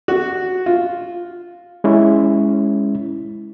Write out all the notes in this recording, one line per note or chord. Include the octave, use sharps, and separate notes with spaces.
F#4
F4
G#3 C#4 E4